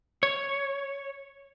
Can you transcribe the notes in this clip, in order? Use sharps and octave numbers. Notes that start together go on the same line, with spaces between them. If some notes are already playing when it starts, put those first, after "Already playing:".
C#5